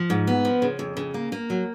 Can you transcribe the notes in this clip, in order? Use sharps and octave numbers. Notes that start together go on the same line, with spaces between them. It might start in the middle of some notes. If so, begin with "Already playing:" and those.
Already playing: F3
G#2
B3
F3
C#3
F2
C#3
A#3
A#3
F#3